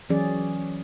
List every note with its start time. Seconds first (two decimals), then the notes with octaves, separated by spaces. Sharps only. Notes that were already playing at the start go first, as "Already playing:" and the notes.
0.10 E3 F#3 C#4 G#4 D5